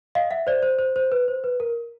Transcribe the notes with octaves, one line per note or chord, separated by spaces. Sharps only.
D#5 F5
E5 F#5
C5 D5
C5
C5
C5
B4
C5
B4
A#4